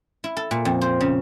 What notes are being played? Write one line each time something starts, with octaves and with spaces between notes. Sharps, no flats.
E4
A4
A#2
F2
C5
C#3